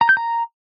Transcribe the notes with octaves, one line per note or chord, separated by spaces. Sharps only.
A#5
G6
A#5